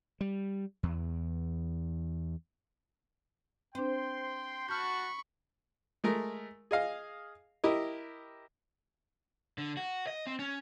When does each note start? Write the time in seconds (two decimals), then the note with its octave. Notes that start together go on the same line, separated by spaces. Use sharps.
0.21 G3
0.83 E2
3.75 C4 D4 C5 G5 C6
4.69 F#4 A5 B5 C#6 F6 G6
6.04 G#3 A3 A#4
6.71 G#4 D#5 F5
7.64 E4 G4 A#4 D#5
9.58 D3
9.77 F#4
10.07 D#5
10.27 C4
10.39 C#4